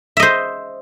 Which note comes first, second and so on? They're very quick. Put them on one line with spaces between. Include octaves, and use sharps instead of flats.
E5 D#5 C5